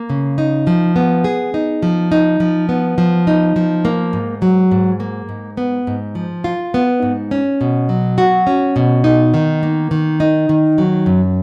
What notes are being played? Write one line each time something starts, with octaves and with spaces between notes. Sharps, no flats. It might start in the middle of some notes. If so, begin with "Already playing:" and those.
Already playing: A#3
C#3
D#4
F3
B3
G#4
D#4
F3
D#4
F3
B3
F3
D#4
F3
A#3
G#2
F#3
G#2
A#3
G#2
B3
G#2
F3
F4
B3
G#2
C#4
B2
F#3
F#4
C#4
B2
D#4
D#3
A#3
D#3
D#4
D#3
F#3
F#2